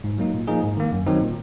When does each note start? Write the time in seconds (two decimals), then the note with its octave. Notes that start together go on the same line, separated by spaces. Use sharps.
0.04 G#2
0.18 F#3 A#3 D#4
0.34 A#2
0.48 F3 A#3 D#4 G#4
0.63 G#2
0.77 D#3 A#3
0.92 F#2
1.07 D#3 F#3 C4 D#4
1.21 A#2